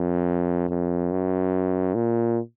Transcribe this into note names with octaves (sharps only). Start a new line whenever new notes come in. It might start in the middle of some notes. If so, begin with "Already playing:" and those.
Already playing: F2
F2
F#2
A#2